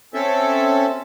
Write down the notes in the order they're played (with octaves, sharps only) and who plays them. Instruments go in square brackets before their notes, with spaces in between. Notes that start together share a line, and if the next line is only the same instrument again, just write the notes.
[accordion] C4 C#4 A4 E5